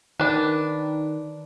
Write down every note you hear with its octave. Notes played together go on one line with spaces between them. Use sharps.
D#3 D4 B4